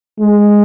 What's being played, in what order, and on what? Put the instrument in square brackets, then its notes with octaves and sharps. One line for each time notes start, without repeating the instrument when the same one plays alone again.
[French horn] G#3